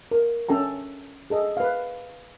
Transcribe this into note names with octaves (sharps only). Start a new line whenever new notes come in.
A#4
C#4 A4 G5 A#5
G#4 A4 D#5
B4 F5